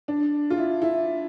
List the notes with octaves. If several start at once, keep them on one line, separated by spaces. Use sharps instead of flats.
D4
F4
E4
E4